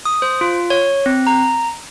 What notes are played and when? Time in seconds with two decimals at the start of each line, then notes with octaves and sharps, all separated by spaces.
0.05 D#6
0.22 C5
0.41 F4
0.70 C#5
1.06 C4
1.27 A#5